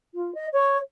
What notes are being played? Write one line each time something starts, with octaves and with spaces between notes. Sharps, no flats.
F4
D#5
C#5